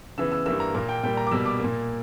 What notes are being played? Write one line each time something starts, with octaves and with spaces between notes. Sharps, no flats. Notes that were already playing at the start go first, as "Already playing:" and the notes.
C#3 E3 B3 E6
E6
G2 E3 A#3 E6
A#5
A#2 A#3 A#5
G5
A#2 G3 A#3 G5
A#5
D6
B2 G3 A#3 E6
D6
A#2 A#3